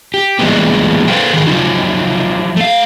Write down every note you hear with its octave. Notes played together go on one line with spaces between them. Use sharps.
G4
A#2 E3 G3 G#3 B3
A4 B4 C5 F5 G5
D#3 G#4
F3 F#3 G#3 D#4 F4
A3 F5